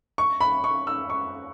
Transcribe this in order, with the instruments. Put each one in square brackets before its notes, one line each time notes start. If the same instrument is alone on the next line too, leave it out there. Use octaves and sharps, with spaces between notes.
[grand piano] C#6
B5
C#6
E6
C#6